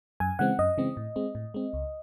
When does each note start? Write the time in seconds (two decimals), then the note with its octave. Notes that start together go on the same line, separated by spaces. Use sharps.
0.20 F#2 G#5
0.39 C#3 E3 G#3 C4 F#5
0.59 F#2 D#5
0.78 C#3 E3 G#3 C4
0.97 A2
1.16 G#3 C4
1.35 A2
1.54 G#3 C4
1.73 C#2